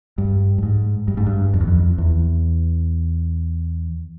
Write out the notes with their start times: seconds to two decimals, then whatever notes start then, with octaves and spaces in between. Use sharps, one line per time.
0.18 G2
0.58 G2
0.63 G#2
1.08 G2
1.17 G#2
1.27 G2
1.54 F2
1.61 E2
1.68 F2
1.98 E2